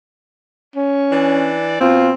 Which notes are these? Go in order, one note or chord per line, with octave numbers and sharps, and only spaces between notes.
C#4
E3 D4 D5
B2 C4 F4